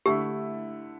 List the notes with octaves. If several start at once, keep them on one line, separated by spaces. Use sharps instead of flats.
D3 A3 E4 G4